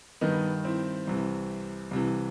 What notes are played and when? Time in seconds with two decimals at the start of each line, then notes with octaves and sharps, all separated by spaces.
0.21 G2 D#3 B3 D#4
0.65 C4 E4
1.07 C2 C3 E3
1.91 C2 C3 E3